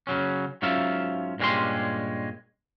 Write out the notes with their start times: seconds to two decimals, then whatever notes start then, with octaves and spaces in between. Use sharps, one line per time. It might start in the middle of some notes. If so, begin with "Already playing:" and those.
0.07 C#3 F#3 C#4
0.62 G#2 F#3 C#4 F4 E5 F5
1.40 G2 A#2 G#3 C#4 G4 C6